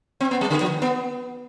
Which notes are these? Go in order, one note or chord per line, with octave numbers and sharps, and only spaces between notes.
C4
B3
G3
D3
F3
B3